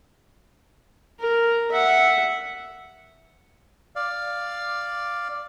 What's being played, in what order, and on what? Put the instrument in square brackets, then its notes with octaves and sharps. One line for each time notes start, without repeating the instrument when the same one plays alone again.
[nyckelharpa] A#4
E5 F#5
[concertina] D5 F5